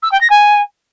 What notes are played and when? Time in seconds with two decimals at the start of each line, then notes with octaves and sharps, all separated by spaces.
0.02 E6
0.11 G5
0.20 A#6
0.30 G#5